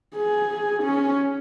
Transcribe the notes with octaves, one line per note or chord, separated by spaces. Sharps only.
G#4
C#4